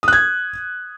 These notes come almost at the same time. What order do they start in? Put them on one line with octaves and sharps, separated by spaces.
D#6 F#6 G#6